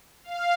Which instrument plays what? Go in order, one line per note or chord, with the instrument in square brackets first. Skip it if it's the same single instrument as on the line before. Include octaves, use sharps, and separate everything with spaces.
[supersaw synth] F5